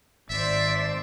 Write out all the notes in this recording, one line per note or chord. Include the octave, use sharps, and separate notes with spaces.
G#1 C5 D5 E5